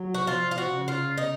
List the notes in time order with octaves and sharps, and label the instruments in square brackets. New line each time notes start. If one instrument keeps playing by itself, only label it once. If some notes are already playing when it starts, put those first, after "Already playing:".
Already playing: [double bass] F#3
[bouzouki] F#4
[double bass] F3 [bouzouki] F4
[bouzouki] F4
F#4
[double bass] C#3
[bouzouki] F4
D#4